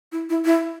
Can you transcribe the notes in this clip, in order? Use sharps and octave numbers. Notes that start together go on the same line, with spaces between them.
E4
E4
E4